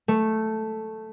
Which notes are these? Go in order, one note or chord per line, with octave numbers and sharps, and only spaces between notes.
A3